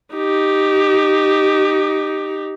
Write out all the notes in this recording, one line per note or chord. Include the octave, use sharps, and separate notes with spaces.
D#4 G4